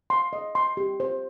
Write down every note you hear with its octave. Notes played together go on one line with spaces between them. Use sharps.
C6
D#5
C6
G4
C5